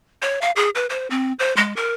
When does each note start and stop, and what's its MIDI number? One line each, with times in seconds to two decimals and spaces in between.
0.22 0.39 73
0.42 0.51 77
0.56 0.69 68
0.75 0.86 71
0.90 1.08 72
1.10 1.33 60
1.39 1.55 72
1.57 1.75 56
1.76 1.95 70